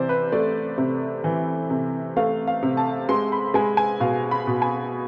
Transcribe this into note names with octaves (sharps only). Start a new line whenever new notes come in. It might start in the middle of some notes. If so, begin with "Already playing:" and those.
Already playing: C3 E3 C5 D5
B4
A3 D5
C3
E3
C3
A3 F5
F5
C3
A5
G#3 C6
B5
G#3 G#5
G#5
B2 F5
B5
B2
G#5